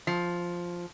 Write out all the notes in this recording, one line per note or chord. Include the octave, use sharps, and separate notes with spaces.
F3